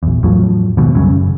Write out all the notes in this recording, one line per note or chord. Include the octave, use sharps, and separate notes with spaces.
A#1 E2
E2 A2 F3 F#3
D#2 G#2 B2
C2 F#2 C#3
F#1